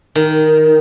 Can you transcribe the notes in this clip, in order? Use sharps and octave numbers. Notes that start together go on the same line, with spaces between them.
D#3